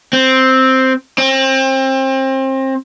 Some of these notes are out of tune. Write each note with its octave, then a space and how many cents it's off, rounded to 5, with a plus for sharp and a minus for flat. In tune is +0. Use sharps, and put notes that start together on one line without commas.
C4 +0
C4 +30